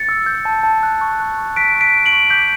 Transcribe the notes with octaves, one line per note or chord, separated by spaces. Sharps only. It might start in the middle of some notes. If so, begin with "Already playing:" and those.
Already playing: A6 C#7
E6
G6
A5
A5
F#6
C#6
F#6
C#6
F#6 B6 D7
C#6
B6 D7
F#6
D7 F#7
C#6
D6 G6 B6